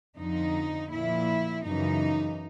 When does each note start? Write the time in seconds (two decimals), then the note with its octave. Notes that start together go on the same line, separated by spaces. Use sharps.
0.17 F2 D3 F3 D#4
0.91 A#2 F3 E4
1.63 F#2 C#3 E3 D#4